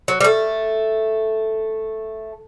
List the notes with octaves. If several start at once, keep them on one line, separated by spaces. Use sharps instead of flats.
F#3
G3
A3